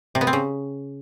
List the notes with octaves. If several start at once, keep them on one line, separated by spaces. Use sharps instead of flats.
C3
B3
C4
C#3